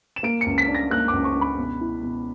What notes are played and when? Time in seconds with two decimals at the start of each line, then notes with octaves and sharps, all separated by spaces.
0.16 E7
0.23 A#3 D7
0.41 C#7
0.46 C#2
0.58 B6
0.68 D4
0.75 A#6
0.90 A#3 F#6
1.08 C#2 D6
1.24 C#6
1.35 D4
1.41 B5
1.57 B2
1.81 E4
2.03 B2